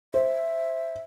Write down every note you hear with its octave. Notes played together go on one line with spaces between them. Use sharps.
C5 E5